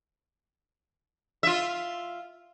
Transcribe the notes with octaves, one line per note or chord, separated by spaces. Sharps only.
F4 E5